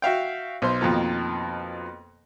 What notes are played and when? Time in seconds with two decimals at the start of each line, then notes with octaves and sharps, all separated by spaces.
0.02 F#4 E5 F5 G5
0.62 B1 C5 C6
0.81 F2 B2 D#3 F3 A#3